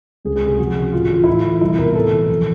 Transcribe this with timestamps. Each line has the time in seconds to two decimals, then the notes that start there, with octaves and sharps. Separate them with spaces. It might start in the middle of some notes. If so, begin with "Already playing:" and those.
0.25 C#2 G#4
0.36 G#4
0.42 C3
0.47 G#4
0.58 F2 F#4
0.77 C#3
0.92 A2 F4
1.10 E3 F4
1.24 A2 E4
1.37 F4
1.44 E3
1.61 C2 E4
1.78 B2 A#4
1.95 A2 A4
2.12 E3
2.29 F2